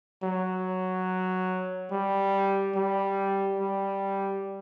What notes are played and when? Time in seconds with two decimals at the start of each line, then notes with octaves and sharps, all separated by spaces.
0.23 F#3
1.92 G3
2.76 G3
3.60 G3